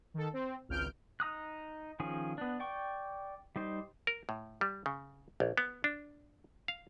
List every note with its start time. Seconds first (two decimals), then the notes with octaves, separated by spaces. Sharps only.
0.14 D#3 A4
0.33 C4
0.69 G#1 C#2 F6 G6 D7
1.20 D#4 A#5 D#6 F#6
2.00 D#3 F3 C#4 G#4
2.38 B3 D4
2.60 D5 G5 C#6
3.56 G3 D#4 C5
4.07 A#4
4.29 A2
4.61 G3
4.86 C#3
5.40 A#1
5.57 B3
5.84 D4
6.68 F5